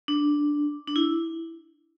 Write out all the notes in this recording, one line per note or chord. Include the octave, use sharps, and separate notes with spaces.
D4
D4
E4